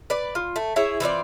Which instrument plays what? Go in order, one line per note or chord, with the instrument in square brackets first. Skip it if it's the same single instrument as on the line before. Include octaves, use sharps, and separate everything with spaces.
[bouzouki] B4 D5
F4
A3
E4 G#4 C#5 E5
E3 C4 F4 D5